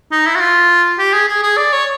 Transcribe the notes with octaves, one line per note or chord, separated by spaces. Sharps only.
D#4
E4
F#4
F4
G4
G#4
G#4
G#4
D5
C#5